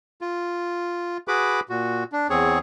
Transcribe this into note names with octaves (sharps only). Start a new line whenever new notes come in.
F4
F#4 G#4 B4 B5 D6
A#2 F#4
D4
E2 C4 G#4 C#5